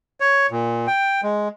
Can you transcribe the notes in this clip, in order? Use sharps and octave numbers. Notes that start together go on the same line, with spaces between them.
C#5
A#2
G5
G#3